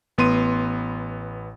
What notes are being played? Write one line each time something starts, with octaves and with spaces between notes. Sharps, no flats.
A1 B3 C6 D#7